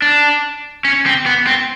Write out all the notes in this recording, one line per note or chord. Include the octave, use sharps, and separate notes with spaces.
D4
C#4
C4
B3
C4